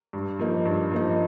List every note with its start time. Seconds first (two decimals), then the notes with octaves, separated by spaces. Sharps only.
0.13 G2
0.39 F3 A#3 D#4
0.65 G2
0.91 F3 A#3 D#4